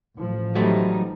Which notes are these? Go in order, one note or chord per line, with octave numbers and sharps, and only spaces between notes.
A1 F3
E3 F#3 G3 A3 D#4